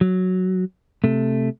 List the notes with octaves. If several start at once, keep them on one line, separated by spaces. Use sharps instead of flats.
F#3
C3 A3